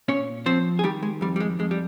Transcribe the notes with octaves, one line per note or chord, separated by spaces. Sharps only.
A#2 C#4 C#5
F3 C4 C5
G#4
D#3 G3 G4
G#3
F2 G3
G3
G#3
F2 G#3
G3